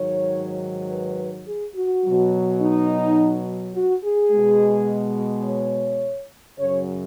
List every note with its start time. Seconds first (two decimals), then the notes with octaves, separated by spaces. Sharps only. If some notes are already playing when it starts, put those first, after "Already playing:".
Already playing: G#2 D#3 F#3 C#5
0.90 B4
1.48 G#4
1.76 F#4
2.05 B2 F#3
2.62 D#4
3.75 F#4
4.04 G#4
4.31 B2 G#3
5.45 C#5
6.59 F#2 C#3 F#3 C#5